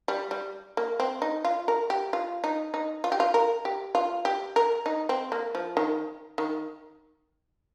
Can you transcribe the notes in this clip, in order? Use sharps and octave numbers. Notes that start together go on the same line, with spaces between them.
G3
G3
A#3
C4
D#4
F4
A#4
G4
F4
D#4
D#4
F4
G4
F4
A#4
G4
F4
G4
A#4
D#4
C4
A#3
F3
D#3
D#3